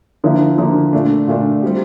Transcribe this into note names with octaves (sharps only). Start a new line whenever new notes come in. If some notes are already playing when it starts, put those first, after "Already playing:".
D3 F3 A#3 E4
D3 F3 A#3 E4
A#2 A3 D4
A#2 A3 D4
G3 C4 G4